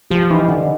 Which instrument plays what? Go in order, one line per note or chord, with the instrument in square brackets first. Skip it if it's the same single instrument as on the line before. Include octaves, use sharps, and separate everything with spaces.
[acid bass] F3 [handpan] G4
[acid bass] E3 [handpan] D#4
[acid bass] D3 [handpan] D#4